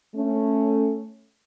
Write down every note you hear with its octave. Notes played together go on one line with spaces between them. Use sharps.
A3 C#4